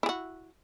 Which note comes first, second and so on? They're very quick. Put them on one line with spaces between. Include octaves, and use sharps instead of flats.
E4 G#4 F#4